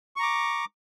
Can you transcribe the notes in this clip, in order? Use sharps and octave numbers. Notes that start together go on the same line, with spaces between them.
A#5 C#6 D6